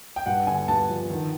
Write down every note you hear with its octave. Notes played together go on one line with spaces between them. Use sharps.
G5
G2 F#5
D3 G#5
G2 A5
F3
D#3